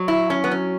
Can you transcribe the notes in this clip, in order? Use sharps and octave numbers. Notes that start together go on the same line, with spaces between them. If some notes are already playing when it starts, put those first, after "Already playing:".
Already playing: F#3
E4
C#4
B3
C#4